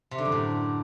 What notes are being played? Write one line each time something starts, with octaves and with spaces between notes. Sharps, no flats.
C3
D3
F#2
A2